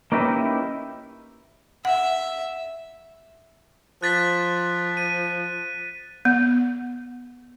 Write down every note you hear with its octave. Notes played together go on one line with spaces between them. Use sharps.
A#3 C#4 D#4 E4 G4 B4
E5 F#5
F3 F#6 A6 B6
D#7
B3